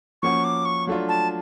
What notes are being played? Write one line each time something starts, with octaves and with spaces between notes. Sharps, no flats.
F3 A#3 C#4 F#4 C#6
D6
C#6
F#3 A3 D4 F4
A5